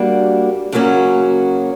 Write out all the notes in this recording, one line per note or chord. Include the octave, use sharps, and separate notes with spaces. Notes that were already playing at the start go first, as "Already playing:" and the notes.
Already playing: G3 A#3 D4 F#4
C#3 F#3 A#3 C#4 F#4